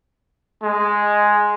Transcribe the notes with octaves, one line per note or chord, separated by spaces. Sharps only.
G#3